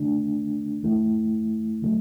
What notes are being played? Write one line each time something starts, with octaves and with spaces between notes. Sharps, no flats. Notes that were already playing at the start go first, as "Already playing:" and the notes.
Already playing: D3 A3 D4
E3 A3 E4
D3 F#3 A3